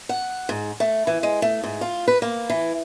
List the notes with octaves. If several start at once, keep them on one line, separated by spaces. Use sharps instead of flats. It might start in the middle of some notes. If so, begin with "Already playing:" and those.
F#5
G#2
A3
E3
G#3
A3
G#2
F4
B4
A#3
E3